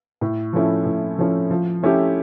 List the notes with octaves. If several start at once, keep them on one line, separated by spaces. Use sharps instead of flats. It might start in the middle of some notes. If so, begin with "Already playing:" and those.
A2
F3 A3 C#4 E4
A2
F3 A3 C#4 E4
F3
A3 C#4 E4 G4